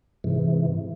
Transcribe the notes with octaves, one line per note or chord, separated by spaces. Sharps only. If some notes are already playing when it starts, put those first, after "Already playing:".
G#2 C3 E3